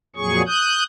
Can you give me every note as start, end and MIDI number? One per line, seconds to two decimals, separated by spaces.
0.16 0.42 41
0.16 0.42 46
0.16 0.42 54
0.16 0.42 68
0.16 0.42 85
0.47 0.83 87
0.47 0.83 90
0.47 0.83 91